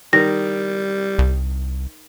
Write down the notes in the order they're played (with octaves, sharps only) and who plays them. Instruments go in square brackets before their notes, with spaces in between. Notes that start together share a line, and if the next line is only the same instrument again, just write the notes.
[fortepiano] D#3 [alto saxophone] G3 [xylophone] A#6
[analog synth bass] C2